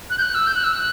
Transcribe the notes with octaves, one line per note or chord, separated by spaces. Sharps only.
F#6
G6
F#6
E6
G6
F#6
E6
F#6